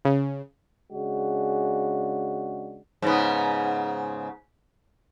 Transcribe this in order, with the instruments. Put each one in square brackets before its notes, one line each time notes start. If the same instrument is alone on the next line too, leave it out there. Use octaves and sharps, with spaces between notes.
[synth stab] C#3
[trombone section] C#3 G#3 D4 F#4
[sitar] G#2 C#3 B3